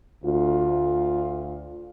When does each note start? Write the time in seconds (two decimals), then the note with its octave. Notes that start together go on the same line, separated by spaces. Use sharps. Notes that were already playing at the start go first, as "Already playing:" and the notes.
0.24 D2 F4